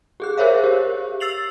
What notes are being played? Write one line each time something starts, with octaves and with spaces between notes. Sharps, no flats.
G4 G#4 F#6
G#4 A#4 C5 C#5 E5 F5
G4
E6 A6 C7 F7 F#7